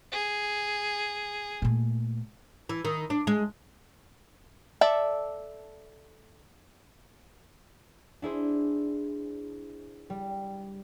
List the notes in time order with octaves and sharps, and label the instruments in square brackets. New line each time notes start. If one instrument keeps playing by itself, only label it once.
[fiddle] G#4
[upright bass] A#2 A3
[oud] E3
D#3
D4
G#3
[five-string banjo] A4 D5 E5 A5
[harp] D4 E4 G#4 C5
G3